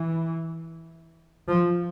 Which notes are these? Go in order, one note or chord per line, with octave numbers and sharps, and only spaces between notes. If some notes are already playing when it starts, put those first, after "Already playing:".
Already playing: E3
F3